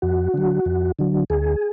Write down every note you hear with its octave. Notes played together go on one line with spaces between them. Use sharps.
F2 F#4
D3 F#3
F2
D3 F#3
D2 G#4